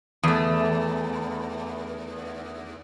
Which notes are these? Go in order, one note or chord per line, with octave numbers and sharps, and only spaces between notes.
E2 A3